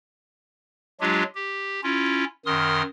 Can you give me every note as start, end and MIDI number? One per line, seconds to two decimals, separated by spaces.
1.01 1.23 54
1.01 1.23 56
1.01 1.23 62
1.01 1.23 65
1.01 1.23 67
1.35 1.81 67
1.83 2.24 61
1.83 2.24 64
1.83 2.24 65
2.46 2.82 42
2.46 2.82 51
2.46 2.82 84
2.46 2.82 87
2.46 2.82 89